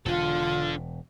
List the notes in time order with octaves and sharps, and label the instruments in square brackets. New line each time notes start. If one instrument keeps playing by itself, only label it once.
[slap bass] E1 [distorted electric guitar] D4 A4 [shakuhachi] F4